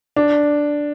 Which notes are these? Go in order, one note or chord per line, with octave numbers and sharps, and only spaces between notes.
D4